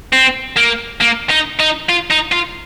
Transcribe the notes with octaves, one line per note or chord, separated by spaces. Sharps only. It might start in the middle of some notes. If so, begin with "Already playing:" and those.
C4
A#3
A#3
D#4
D#4
F4
D#4
F4